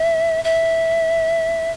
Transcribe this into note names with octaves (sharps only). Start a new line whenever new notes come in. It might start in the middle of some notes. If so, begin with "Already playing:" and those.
Already playing: E5
E5